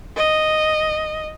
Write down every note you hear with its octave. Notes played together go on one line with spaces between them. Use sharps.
D#5